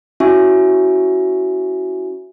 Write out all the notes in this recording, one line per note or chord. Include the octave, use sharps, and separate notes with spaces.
C#4 E4 F#4 E5 G#5 C#6